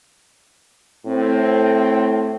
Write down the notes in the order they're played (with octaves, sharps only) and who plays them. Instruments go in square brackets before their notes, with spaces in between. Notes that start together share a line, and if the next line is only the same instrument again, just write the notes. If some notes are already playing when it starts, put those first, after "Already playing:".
[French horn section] A2 C4